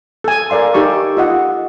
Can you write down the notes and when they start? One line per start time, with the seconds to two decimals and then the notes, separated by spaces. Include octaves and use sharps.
0.24 A4 G#5
0.50 A4 A#4 D5 F5 C6
0.74 D#4 G4 A4 C#6
1.17 F4 D#5 F#5